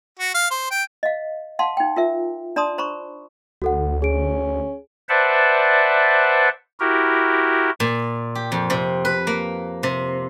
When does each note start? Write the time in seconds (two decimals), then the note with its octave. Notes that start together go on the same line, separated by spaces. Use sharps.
0.19 F#4
0.35 F5
0.51 C5
0.71 G5
1.03 D#5 F5
1.59 F5 F#5 A5 C6
1.77 D#4 G5
1.96 F4 A#4 E5
2.56 D4 D5 A5 A#5 C6 D#6
2.78 C5 A#5 B5 C#6
3.62 D2 F#4 A4 F#5
4.02 C#4 G#4 D7
5.09 B4 C5 D5 E5 F#5 A5
6.80 E4 F#4 G4 A#4
7.80 A#2
8.35 G4
8.52 F2
8.70 C3
9.05 B4
9.27 A#3
9.83 C3